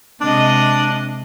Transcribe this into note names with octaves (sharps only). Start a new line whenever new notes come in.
C3 G#3 D4 D#5